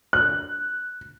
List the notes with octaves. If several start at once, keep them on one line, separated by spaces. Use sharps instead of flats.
F#6